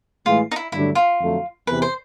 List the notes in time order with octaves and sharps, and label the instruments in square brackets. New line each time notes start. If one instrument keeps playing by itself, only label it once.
[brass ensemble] A2 E3 G#3 [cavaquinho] F4
[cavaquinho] D#4
E4
[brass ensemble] G2 D3 F#3 A3 D4 [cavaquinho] E4
[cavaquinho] F4
[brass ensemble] F2 D3 F#3 A3
[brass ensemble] E2 C3 E3 [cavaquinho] B4
[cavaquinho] C5